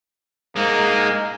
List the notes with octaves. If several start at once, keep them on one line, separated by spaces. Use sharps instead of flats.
G#3 A#3 D#4